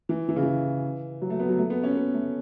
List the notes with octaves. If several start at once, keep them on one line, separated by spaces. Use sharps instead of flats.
E3
E3
C#3
E3
F#3
A3
B3
F#3
A3
B3
C#4
B3
A3